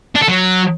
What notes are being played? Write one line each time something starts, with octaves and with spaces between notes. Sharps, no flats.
D4
A4
F#3